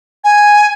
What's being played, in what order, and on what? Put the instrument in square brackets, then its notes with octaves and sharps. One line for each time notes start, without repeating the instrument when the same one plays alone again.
[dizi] G#5